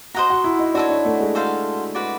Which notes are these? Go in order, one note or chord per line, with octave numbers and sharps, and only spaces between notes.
F#4 C5 D#5 F#5 A#5
F#4
E4
D#4
D4 F#4 A4 C#5
D4
A3
G#3
F#4 A4 C5 F5
F#4 B4 D5